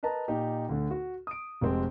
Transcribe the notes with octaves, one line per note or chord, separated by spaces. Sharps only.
A#4 B4 D#5 A5 A#5
A#2 D#4 G4
D2 D3
F#4
D#6 D7
F1 G#3 C4